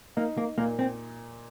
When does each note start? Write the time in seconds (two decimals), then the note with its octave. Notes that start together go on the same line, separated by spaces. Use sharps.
0.17 A#3 D#4
0.38 A#3
0.58 A#2 A#3
0.79 C4